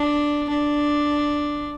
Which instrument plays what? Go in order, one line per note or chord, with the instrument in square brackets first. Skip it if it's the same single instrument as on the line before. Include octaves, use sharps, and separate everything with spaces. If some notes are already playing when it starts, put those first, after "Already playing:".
Already playing: [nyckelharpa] D4
D4